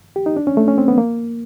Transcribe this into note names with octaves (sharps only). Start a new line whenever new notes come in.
G4
D#4
D4
C#4
A3
C#4
C4
B3
A#3